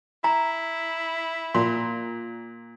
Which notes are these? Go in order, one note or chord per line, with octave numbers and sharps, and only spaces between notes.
E4 A#5
A#2 C6